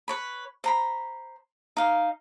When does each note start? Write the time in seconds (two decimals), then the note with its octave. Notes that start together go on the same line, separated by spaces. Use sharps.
0.08 B4 C#5 B5
0.64 C5 A#5 B5
1.77 D#4 F5